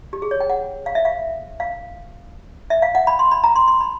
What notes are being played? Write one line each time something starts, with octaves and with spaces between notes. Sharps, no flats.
G4
G#4
C#5
G5
F#5
F5
E5
F5
F5
E5
F5
F#5
B5
C6
B5
A#5
C6
C6
B5